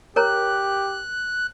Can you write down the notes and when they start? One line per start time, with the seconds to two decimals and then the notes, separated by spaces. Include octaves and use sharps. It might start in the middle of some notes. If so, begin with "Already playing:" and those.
0.16 G4 A#4 C#5 A#5 F#6